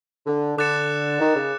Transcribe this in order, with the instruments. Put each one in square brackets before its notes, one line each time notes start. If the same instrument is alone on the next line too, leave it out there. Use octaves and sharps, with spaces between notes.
[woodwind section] D3
[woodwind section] D3 [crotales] D6 F#6 A6 C#7 E7
[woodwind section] D#3
C#3